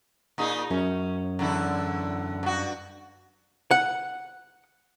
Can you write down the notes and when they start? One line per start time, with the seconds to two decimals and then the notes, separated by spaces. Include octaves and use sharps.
0.38 A#2 D#4 G#4
0.70 F#2 C#4
1.39 E2 D3 E4
2.43 G2 F#4
3.71 F#5